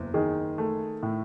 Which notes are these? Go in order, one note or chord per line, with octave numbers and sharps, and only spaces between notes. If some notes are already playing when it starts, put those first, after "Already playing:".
Already playing: F#1 E2
D#3 G#4
A3
A2